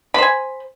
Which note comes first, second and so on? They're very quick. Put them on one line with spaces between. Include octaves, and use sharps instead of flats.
B5 C5 G#5